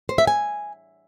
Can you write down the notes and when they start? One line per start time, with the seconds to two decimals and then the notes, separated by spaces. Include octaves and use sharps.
0.09 C5
0.18 E5
0.27 G#5